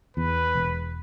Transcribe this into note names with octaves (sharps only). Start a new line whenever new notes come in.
E2 B4
E1